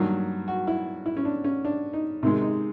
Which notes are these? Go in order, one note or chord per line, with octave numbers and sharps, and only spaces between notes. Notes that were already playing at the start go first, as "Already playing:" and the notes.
Already playing: G2 D#3 F#3 A#3
F#4
E4
E4
C#4
D4
C#4
D4
D#4
C3 D#3 G#3
D#4